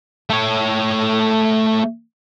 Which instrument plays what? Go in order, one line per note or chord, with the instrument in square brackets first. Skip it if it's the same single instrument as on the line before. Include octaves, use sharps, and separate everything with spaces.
[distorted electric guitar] A3 C#5